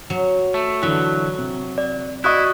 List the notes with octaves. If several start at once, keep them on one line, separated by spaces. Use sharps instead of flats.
F#3
A3
D3 E3 F#3 E5
C3
D5
E4 F#4 D5 D#5 C#6 D#6 F#6